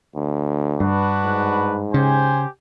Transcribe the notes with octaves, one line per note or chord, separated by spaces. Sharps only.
D2
G2 D4 F#4 B4
G#2
C#3 G4 C5 G#5